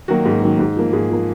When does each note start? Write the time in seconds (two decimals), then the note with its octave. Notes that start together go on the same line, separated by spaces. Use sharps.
0.08 D#3 F#3 A#3 F#4
0.25 G#2
0.42 D#3 F#3 A#3
0.59 G#2
0.76 F3 A#3
0.93 G#2 G#4
1.10 F3 A#3